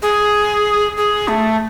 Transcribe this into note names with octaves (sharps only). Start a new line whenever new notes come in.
G#4
G#4
A3